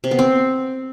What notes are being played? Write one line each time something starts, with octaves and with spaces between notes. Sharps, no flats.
C3
B3
C4